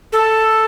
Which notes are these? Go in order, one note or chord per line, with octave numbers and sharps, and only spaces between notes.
A4